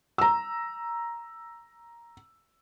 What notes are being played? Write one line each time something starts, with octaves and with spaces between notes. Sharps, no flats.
A#5 E6